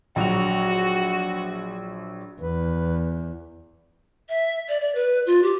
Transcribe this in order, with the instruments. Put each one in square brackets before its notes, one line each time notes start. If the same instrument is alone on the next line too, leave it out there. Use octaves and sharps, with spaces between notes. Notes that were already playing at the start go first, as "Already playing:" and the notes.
[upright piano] A#1 F#3 F7 [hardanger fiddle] F#4
[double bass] E2 [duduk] B4
[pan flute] E5
D5
D5
B4
F4
G4